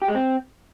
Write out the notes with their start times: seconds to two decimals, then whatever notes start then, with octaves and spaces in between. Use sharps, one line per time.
0.02 G4
0.08 G#3
0.15 C4